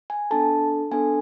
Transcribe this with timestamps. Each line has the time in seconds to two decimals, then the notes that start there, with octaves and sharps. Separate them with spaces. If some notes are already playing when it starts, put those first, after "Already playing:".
0.10 G#5
0.31 B3 D4 A4 A5
0.91 B3 D4 A4 G#5